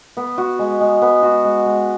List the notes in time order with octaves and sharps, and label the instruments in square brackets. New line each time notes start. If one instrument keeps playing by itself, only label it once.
[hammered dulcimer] B3
F#4
G#3
G#3
B3
F#4
G#3
G#3